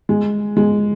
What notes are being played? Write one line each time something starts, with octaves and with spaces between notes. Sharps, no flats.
G#3
G#3